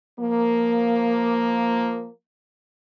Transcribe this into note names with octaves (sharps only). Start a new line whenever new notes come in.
F3 A#3